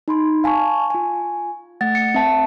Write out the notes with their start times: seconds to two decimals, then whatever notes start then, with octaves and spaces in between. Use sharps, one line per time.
0.08 D#4 B5 C6
0.44 F5 G#5 A5 C#6
0.90 F4 G#5
1.81 A3 F#5 A6
1.95 C#7
2.14 C4 E5 A5